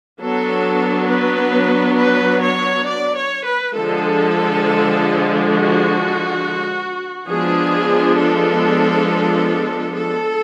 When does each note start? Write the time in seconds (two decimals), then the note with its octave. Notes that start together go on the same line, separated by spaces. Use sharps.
0.21 F#3 B3 D4 A4
1.09 B4
1.98 B4
2.42 C#5
2.87 D5
3.16 C#5
3.45 B4
3.75 D3 F3 G#3 A4
5.52 F#4
7.28 F3 G#3 B3 D4 G#4
8.17 A4
9.94 A4